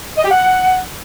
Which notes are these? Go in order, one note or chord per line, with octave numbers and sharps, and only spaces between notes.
D#5
G4
F#5